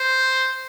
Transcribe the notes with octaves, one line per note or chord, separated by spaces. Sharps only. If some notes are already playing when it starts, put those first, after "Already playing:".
Already playing: C5